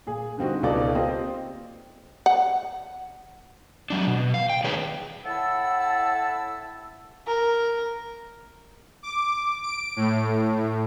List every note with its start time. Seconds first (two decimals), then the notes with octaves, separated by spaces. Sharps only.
0.07 A#2 G#4
0.38 D3 G3 C4 D#4 F#4
0.63 C#2 B2 D#4 A4 D5
0.95 A#3 C4 F4 G4 C5 D#5
2.26 F#5
3.90 F#3 D4
4.07 B2
4.34 F5
4.49 G5
4.64 D#3 D4 D#4 G#4 B4 C#5
5.24 A2 E4 F#5 A5 E6
7.27 A#4
9.03 D6
9.62 D7
9.96 A2